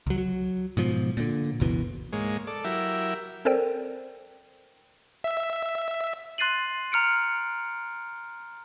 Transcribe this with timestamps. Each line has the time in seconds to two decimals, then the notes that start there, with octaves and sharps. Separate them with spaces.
0.07 C#2 F#3
0.18 F#3
0.77 G#2 B2 F3
1.17 A#2 D3
1.60 F#1 C#2 B2 E3
2.13 G#2 G#3 A#3 C#5
2.47 A4 D5
2.64 F#3 E4 G4 A#4 E5
3.45 C4 A4 A#4 C5 D5 G5
5.24 E5
6.38 C6 F#6 A6 C7 D#7 F#7
6.92 A#5 F6 C#7 D7